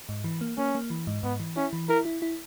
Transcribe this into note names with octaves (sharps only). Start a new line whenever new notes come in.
G#2
E3
A#3
A#3 C#4
A#3
E3
G#2
G#2 B3
E3
C#4 E4
E3
E4 A#4
E4
E4